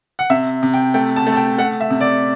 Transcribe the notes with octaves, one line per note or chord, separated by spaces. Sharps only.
F#5
C3 E5
C3
G5
A3 G5
A5
A3
A5
G5
A3 F#5
E5
C3
D5